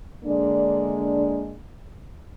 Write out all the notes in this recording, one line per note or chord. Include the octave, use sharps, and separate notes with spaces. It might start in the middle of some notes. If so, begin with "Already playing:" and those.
D3 G#3 A#3 D4